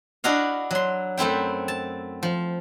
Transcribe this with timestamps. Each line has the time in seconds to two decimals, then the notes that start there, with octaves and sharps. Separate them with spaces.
0.24 D4 E4 F#4 D#5 F5
0.71 F#3 C6
1.17 F#2 A3 C4 E4 G5
1.68 A5
2.23 F3